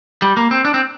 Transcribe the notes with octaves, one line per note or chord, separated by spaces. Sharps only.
G3
A#3
C4
D4
C4